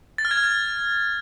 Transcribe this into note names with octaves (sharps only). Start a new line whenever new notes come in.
A6
F6
G#6
F6
G#6